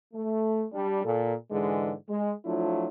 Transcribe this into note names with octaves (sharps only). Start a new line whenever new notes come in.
A3
G3 D4
A#2 A4
G#2 D3 E3 G#3
G#3
F3 F#3 A3 D4 E4 F4